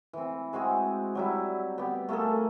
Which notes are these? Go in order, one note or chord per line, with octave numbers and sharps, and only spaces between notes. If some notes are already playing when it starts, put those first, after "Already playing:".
E3 C4
G#3 C4 F#4 G#4
F#3 G3 E4
B3 G4
A3 A#3 G#4 A4